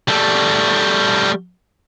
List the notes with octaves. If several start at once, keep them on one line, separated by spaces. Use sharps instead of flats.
G3 A3